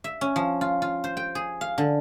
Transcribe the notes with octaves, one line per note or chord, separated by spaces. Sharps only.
E5
C#4
F3
F4
F4
C5
G5
G#4
F5
D3